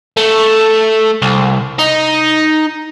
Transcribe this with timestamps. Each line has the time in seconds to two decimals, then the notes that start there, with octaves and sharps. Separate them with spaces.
0.17 A3
1.22 C2
1.79 D#4